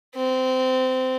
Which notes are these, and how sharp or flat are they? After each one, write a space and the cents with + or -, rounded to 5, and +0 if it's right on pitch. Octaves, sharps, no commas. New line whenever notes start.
C4 -20